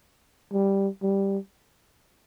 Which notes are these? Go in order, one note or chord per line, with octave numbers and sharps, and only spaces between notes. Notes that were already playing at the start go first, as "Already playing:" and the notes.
G3
G3